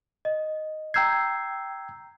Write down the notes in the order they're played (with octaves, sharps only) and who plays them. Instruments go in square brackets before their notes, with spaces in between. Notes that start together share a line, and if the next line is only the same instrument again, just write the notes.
[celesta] D#5
[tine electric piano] G5 E6 G#6 [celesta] A#5 G6 C7